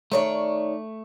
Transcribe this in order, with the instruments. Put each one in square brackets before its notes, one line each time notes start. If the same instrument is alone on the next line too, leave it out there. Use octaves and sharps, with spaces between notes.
[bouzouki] D#3 C#5 D5 [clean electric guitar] A3